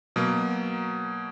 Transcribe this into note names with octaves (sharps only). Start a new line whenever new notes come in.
B2 F#3 A#3